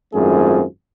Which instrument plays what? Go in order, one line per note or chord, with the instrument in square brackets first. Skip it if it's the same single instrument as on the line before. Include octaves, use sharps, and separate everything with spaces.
[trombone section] G#1 F#2 A3 C4 F4 G#4